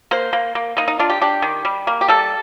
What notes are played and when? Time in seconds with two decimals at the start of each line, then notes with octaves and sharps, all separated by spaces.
0.11 A#3 C5
0.33 A#3
0.55 A#3
0.77 A#3 D#4
0.88 D#4
0.99 D4 F4
1.10 G4
1.21 D4 G4
1.42 D#3
1.65 G3
1.87 A#3
2.01 G4
2.08 G3 A4